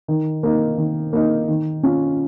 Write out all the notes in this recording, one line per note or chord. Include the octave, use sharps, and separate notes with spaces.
D#3
A#3 D#4
D#3
A#3 D#4
D#3
C#4 F4